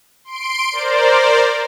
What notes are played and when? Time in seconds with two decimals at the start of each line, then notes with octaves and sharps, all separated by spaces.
0.25 C6 D7
0.72 A#4 C5 D5